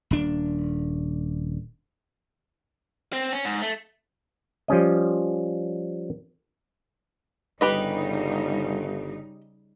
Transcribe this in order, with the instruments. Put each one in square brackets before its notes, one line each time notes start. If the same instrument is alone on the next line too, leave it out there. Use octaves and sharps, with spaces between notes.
[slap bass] D#1 D4
[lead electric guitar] C4
C#4
G#2
A3
[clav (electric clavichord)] F3 G3 C#4 D#5
[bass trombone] G1 [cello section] C#3 G3 D#4 [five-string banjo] G4 B4 D#5